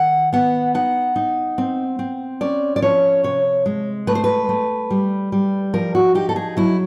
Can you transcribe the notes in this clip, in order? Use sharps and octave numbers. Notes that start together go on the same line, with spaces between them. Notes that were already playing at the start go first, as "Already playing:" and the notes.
Already playing: D#3 F#5
B3 F#5
D#4 F#5
D#4
C4
C4
C#4 D5
D5
F3 C#5
C3 C#5
G#3
A3 B4
C5
B4
A3
G3
G3
F3 A#4
F#4
D#4 G4
A4
G#4
F#3 E4